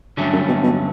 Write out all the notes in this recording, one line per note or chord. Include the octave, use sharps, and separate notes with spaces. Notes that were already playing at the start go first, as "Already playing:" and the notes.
G2 D3 F#3 A3 C#4
F#2
B2
B2